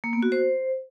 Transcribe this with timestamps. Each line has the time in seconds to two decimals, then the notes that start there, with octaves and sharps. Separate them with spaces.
0.04 A#3
0.13 B3
0.23 F#4
0.32 C5